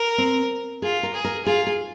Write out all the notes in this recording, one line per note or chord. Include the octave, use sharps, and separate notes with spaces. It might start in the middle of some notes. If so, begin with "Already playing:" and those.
Already playing: A#4
C4
F4 G#4
A#4
G#4
A#4
F4 G#4
G#4